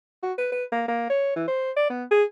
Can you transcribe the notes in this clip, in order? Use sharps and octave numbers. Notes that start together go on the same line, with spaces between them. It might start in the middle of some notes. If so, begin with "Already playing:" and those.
F#4
B4
B4
A#3
A#3
C#5
E3
C5
D5
B3
G#4